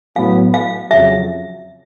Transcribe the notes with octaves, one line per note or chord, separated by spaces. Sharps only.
A2 F#3 B3 F5
F5
F2 C#3 F#3 E5